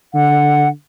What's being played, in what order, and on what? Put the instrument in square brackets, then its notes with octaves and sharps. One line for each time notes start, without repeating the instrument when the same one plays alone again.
[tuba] D3 [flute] F#5